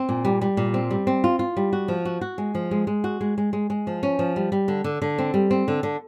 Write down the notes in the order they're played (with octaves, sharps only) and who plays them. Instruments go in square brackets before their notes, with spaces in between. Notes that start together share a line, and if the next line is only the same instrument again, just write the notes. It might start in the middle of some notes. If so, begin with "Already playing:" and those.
Already playing: [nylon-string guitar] C4
A#2
G3
G3
A#2
C4
G3
C4
F4
F4
G3
F#4
F3
F#4
F#4
G#3
F3
G#3
G#3
F#4
G#3
G#3
G#3
G#3
F3
C#4
F3
G3
G3
D3
D3
D3
C4
G3
C4
D3
D3